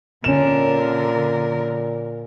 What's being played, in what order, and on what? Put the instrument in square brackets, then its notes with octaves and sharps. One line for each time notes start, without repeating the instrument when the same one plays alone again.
[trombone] A#2 [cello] D3 A#4 [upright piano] C#4 E7